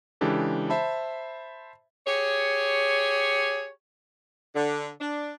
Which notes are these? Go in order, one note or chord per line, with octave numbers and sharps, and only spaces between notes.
C#3 E3 G#3 D4 G4 A4
C5 E5 A5 B5
G4 G#4 C#5
D3
D4